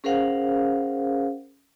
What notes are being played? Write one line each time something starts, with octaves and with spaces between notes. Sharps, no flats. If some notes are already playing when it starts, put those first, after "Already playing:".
C#4 G#4 A#4 C5 F5 F#5